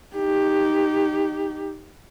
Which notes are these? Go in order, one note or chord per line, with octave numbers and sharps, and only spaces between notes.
D#4 G4